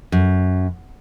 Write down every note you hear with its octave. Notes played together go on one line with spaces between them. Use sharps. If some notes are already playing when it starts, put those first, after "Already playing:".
F#2